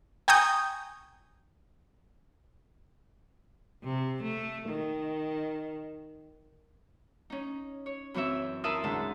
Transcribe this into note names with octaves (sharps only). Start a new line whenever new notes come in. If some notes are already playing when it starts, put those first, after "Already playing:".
G5 G#5 A#5 C#6 D#6 G6
C3
A3
D#3
C#4 D#4
C#5
F#2 E3 C4 C#5 E5
E4 A#4 E5 A5 C6 D#6
D2 G#2 D3 A5